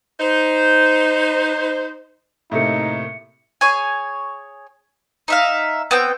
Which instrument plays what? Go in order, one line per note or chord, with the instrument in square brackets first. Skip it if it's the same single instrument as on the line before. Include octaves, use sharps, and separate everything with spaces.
[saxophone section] D#4 C5
[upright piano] A2 C3 A#3 [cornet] D#4 [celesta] E5 C#7
[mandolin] G#4 C#5 G#5
D#4 E5 F5
B3 C4 G5